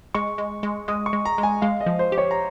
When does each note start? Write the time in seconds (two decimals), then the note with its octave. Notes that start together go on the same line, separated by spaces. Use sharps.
0.14 G#3 C#6
0.38 G#3
0.63 G#3
0.88 G#3 D#6
1.06 C#6
1.13 G#3
1.25 A#5
1.38 G#3
1.43 G#5
1.62 G#3 F5
1.81 D#5
1.86 F3
1.99 C5
2.12 G4
2.18 C#5
2.31 A#5